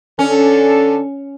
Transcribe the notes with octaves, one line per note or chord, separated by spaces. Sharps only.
D3 C#4 D4 A4